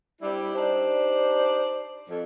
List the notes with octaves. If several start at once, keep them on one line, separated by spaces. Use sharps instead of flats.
G3 C4 D4 E4 G4
D4 D#4 G4 C5 D5
F2